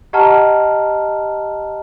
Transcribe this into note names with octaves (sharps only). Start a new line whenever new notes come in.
G4 D#5 F#5 A5 A#5 F6